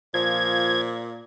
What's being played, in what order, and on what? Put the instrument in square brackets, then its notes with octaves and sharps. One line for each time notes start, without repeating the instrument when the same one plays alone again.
[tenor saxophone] A#2 [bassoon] F3 [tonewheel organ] G#6